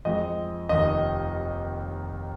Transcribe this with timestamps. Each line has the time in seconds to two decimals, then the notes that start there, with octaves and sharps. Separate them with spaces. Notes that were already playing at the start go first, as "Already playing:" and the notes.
0.05 F2 F3 G#3 D#5
0.69 F1 D#2 D#3 D#5